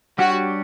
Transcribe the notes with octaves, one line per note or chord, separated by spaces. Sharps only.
G3 D4 F#4 G4 C#5